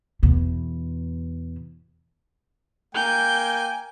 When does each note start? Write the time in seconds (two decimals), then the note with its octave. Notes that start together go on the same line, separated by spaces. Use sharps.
0.23 E2 B2
2.95 A#3 G5 G#5 G6